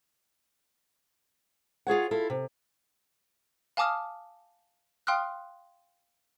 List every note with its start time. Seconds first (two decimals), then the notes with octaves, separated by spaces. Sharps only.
1.87 F4 G#4 C#5 F#5
2.11 E4 F4 A4
2.30 C3
3.77 F5 G#5 A5 D6 D#6 F6
5.07 F5 G5 C6 D#6 F6 F#6